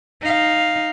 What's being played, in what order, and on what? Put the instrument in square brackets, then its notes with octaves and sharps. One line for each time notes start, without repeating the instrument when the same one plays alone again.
[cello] D#4 F5